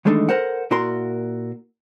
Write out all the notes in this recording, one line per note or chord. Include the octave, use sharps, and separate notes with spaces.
D#3 E3 G#3 A3 D4 D#4
A4 A#4 C5 F#5
A#2 E4 F#4 A#4 C6